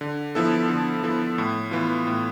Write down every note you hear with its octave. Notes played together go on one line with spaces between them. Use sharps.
D3
F3 B3 E4 A4
D3
F3 B3 E4 A4
A2
E3 B3 F4
A2